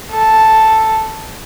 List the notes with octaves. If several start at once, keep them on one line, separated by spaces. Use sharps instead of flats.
A4